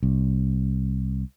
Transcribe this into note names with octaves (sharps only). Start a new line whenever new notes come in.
C2